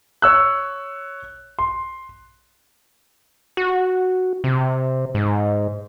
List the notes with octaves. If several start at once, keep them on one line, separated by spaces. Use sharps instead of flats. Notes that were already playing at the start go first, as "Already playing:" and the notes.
C#5 E6 F#6
C6
F#4
C3
G#2